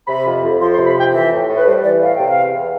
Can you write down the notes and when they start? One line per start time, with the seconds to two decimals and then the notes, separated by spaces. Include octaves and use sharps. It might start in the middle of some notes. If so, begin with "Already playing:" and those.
0.08 C3 B5
0.26 F2
0.43 F2
0.60 F3 C6
0.73 C6
0.78 C3
0.87 B5
0.95 F2
1.00 G5
1.13 E3 E5
1.31 A2
1.48 A2
1.58 B4
1.65 G3 C5
1.83 E3 D5
2.00 A2 F5
2.14 C3 G5
2.28 F5
2.36 E2
2.53 E2